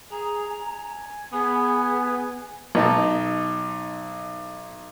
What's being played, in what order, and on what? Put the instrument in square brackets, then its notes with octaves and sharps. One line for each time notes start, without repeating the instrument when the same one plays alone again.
[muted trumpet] G#4 [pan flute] A#5
[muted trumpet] G#5
[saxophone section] B3 [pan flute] G#4
[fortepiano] B1 D#4 A5